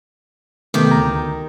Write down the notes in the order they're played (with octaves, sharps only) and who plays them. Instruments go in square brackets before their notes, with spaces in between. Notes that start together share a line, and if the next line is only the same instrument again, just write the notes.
[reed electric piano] C3 A3 B3 [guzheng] D#3 G4
[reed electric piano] D2 A#5